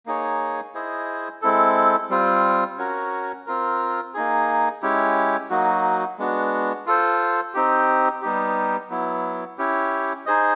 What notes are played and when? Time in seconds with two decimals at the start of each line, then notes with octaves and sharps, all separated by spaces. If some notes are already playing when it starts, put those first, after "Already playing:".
0.06 A#3 D#4 G#4 C#5
0.75 E4 G#4 C5 D#5
1.42 G#3 C4 E4 A4
2.10 G3 C4 F4
2.78 C#4 F#4 A#4
3.47 C4 F4 A#4
4.14 A#3 D#4 G#4
4.82 G#3 C#4 E4 G4
5.50 F#3 A#3 D#4 F#4
6.18 G#3 B3 D4 F#4
6.86 F4 A4 C5
7.54 C4 D#4 G4
8.22 G3 B3 D#4 G4
8.90 F#3 B3 E4
9.58 C#4 E4 G4
10.26 D#4 G#4 C5 D#5